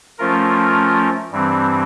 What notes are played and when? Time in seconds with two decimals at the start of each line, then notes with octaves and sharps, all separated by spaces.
0.19 F3 A3 C#4 F4 A#4
1.32 G2 E3 G3 C4